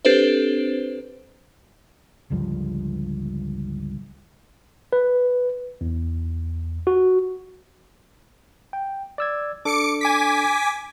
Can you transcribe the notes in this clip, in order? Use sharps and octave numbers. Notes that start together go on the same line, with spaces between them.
C4 D4 G4 A4 B4 C5
G1 C#2 G2 F3
B4
E2
F#4
G5
D5 E6 G#6
D4 A4 D6 C#7 D7
G#5 D6 B6